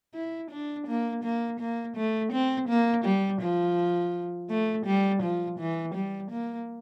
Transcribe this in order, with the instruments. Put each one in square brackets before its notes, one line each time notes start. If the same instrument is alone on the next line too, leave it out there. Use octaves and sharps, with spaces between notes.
[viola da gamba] E4
D4
A#3
A#3
A#3
A3
C4
A#3
G3
F3
A3
G3
F3
E3
G3
A#3